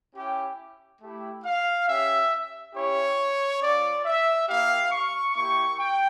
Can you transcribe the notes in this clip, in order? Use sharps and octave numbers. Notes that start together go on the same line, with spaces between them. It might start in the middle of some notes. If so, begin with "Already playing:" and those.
C#4 E4 G4
A3 E4 G4
F5
C#4 G4 E5
C#4 E4 G4 C#5
C#4 F4 D5
E5
A#3 E4 G4 F5
C#6
A#3 E4 G4 C#6
G5